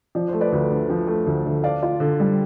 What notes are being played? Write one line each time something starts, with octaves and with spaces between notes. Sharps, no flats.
F3 D5
A3 C5
B4 D5
D2
D3
F3
A3
D2
D3
D4 D5 F5
F4
D3
G3